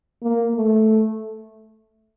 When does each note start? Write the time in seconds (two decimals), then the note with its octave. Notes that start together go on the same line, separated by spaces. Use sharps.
0.23 A#3
0.54 A3